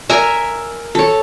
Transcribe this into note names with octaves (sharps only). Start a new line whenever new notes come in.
A#4 E5 G#5 A#5
A4 C#5